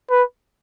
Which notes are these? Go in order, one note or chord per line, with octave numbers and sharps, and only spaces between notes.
B4